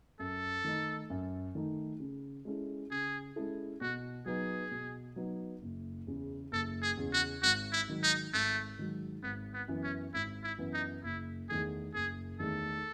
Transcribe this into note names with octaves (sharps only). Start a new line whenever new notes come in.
F#2 A4
D#3 A3 D#4
F#2
D#3 A3 D#4
C#3
G#3 C#4 E4 A4
C#3 G#4
G#3 C#4 E4 A4
B2 F#4
F#3 B3 D#4 G#4
B2
F#3 B3 D#4
F#1
E2 C#3
F#1 A4
G#4
E2 C#3
F#4
G#1 F#4
E4
G#2 D#3 F#3
D#4
G#1 A3
G#2 D#3 F#3
G#1 B3
B3
F#2 E3 B3
C#4
G#1 E4
E4
F#2 E3 B3
D#4
F#1 E4
E2 D#3 A3 G#4
F#1 G#4
E2 D#3 A3 A4